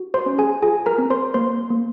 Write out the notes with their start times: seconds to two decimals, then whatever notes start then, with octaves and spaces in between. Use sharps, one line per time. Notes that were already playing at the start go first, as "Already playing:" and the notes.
Already playing: F#4
0.14 C5 C6
0.26 C#4
0.38 G#4 G#5
0.62 F4 G#4 G#5
0.86 A#4 A#5
0.98 C4
1.10 C5 C6
1.34 A#3 C5 C6
1.70 A#3